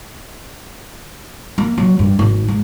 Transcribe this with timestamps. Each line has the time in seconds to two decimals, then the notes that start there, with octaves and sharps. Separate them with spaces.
1.58 A#3
1.78 F#3
1.99 G2
2.19 G#1
2.48 G#2